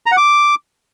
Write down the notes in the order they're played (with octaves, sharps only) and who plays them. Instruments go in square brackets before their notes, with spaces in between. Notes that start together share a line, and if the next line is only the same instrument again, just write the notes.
[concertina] A#5
F#5
D6